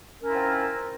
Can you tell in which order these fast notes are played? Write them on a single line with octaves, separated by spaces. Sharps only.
C#4 A#4 E4 F4 C4